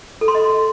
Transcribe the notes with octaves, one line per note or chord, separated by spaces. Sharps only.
A4
C6
D#5